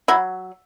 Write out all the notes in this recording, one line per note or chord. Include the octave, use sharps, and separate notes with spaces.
F#3 E4